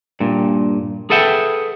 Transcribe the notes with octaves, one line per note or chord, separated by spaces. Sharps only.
G2 A#2
G#4 A4 B4 E5 F#5 G5